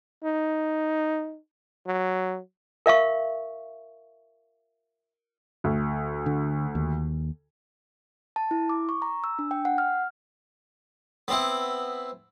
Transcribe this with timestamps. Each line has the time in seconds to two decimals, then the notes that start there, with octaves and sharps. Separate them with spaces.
0.24 D#4
1.87 F#3
2.86 A#4 E5 F5 C#6
5.64 D2
6.26 D3
6.75 D#2
8.36 A5
8.51 E4
8.69 D6
8.89 C#6
9.02 A#5
9.24 E6
9.39 D4
9.51 G5
9.65 F#5
9.78 F6
11.28 B3 C4 E4